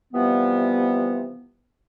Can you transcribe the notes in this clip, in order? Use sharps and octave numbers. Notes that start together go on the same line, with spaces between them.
C3 E3 F3 G3 B3